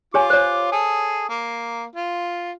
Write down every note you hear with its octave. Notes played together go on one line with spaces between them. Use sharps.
F4 G4 C#5 G#5 D6
C5 C#5
G#4 A4
A#3
F4